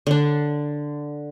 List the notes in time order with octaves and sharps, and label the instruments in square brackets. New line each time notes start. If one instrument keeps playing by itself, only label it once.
[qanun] D3 D4